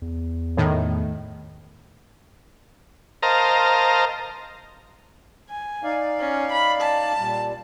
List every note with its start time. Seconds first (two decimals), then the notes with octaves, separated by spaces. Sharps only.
0.02 E2
0.57 A2 D#3
3.23 A#4 C5 D#5 F5 A5 A#5
5.50 G#5
5.83 D#4 D5 F5
6.20 C#4
6.52 B5
6.81 A5
7.18 A#2 G3